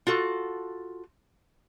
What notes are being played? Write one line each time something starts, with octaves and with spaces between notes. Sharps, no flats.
F4 F#4 A4